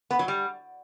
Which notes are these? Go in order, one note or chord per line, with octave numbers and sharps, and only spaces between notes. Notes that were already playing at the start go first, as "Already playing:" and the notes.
B3
F#3
G3